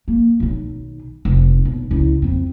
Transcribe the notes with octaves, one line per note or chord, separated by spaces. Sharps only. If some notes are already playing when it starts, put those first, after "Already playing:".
A#3
B1 D#3
F1
B1
C#2 E4
F2 C4